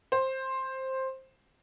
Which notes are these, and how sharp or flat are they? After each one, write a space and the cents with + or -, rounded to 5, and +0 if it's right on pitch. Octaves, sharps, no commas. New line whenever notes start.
C5 +10